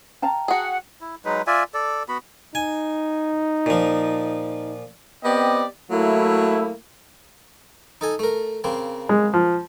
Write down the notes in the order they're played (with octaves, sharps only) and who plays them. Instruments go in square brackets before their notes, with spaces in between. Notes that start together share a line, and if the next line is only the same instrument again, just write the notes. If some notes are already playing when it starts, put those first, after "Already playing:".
[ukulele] F5 A5 A#5 [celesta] G5
[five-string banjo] F#4 G#4 [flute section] F#5
[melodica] E4
F#3 G#3 D#4 B4
F4 D5 E5 G#5
A4 D5
B3 F#4 B5
[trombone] D#4 [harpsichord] G#5
[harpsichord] A#2 F3
[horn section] B3 C4 G4 D5 D#5 G5
F#3 A3 A#3 E4
[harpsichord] D#4 A4 G#5
A3 A#4
C#3 A#3 C4
[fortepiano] G#3
F3